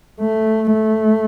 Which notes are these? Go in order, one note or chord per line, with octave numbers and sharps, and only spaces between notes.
A3
A3